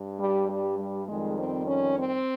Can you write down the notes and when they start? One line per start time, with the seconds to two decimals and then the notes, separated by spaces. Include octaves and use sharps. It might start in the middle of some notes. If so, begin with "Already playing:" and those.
Already playing: G2
0.20 G3
0.49 G3
0.78 G3
1.08 F2 D#3 G3 G#3
1.38 C4
1.66 C#4
1.97 C4